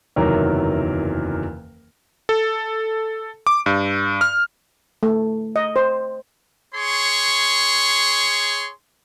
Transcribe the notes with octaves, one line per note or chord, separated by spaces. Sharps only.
F#1 E2 C3 D#3 F#3 A#4
A4
D6
G2
F6
A3
D#5
C5
G#4 C#5 C6 C#6